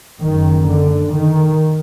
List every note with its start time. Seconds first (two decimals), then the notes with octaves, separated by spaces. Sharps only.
0.21 F#1 F#2 D#3
0.67 D3
1.12 D#3